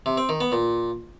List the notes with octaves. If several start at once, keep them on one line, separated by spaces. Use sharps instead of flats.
C3
C4
D#3
B3
A#2